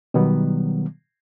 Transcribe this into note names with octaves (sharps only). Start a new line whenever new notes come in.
B2 D#3 F#3 G3 B3